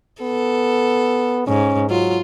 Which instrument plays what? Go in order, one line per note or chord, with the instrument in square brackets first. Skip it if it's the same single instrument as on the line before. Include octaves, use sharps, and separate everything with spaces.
[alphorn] B3 [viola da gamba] A4
[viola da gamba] G#2 [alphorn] C#4
[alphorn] F#3 [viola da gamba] F4